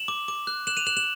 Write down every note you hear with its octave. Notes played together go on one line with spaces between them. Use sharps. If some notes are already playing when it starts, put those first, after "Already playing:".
Already playing: E7 F#7
D6
D6
F#6
F#6 E7 F#7
D#7 F7
F#6 E7 F#7
E7 F#7